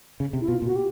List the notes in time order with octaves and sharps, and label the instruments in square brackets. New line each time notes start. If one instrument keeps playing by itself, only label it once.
[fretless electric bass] C#3
C3
[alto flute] E4
[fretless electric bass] B2 [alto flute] F4
[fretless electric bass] A#2
[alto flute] F#4
G4